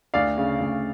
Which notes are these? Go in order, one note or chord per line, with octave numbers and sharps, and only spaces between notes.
D2 D5 F5
C#3
D2